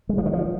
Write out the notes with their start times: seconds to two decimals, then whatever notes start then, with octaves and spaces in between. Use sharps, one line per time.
0.09 G#3
0.18 F3
0.26 D#3
0.33 F3